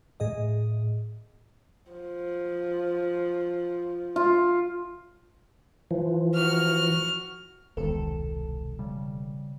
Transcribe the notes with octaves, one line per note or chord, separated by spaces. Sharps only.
A2 G#4 D#5
F3
F4
E3 F3
F#4 F6
E1 C2 D#3 A4
C#3 G3